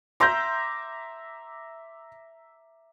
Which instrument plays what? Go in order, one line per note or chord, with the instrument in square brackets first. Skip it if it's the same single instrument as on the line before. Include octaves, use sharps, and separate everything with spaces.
[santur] E5 A#5 D6 [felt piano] C6 G6